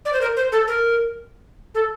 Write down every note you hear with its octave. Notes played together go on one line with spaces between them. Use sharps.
D5
C5
A#4
C5
A4
A#4
A4